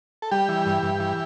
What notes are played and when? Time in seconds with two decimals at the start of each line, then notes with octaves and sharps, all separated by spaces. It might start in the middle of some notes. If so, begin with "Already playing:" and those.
0.22 A4
0.31 G3 G4
0.49 E3
0.66 G2
0.83 G2
1.00 E3